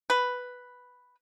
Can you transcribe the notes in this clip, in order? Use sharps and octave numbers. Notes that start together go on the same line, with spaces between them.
B4